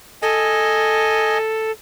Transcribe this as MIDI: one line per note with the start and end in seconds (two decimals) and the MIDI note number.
0.22 1.71 69
0.22 1.38 75
0.22 1.38 80